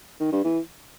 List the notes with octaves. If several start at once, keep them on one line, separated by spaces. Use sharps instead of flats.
D#3
G2
E3